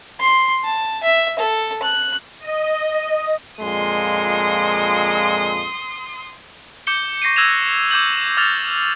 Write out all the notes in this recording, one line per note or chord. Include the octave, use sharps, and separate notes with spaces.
C6
A5
E5
A4
F#6
D#5
F2 A#2 G#3 C6 D#6
D6 G6 C#7 G7
C#6 A#6 C7 C#7 D#7
E6 F#6 G#6 A#6 E7 F7
D6 E6 G6 G#6 F#7
D6 E6 F6 A6 F7